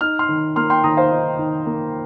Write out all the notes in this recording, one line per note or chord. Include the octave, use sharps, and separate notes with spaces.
D#4 F6
C6 F6
D#3
A#3 C6 F6
G5 C6
D#3 A#5 D#6
C5 F5
D#4
D#3
A#3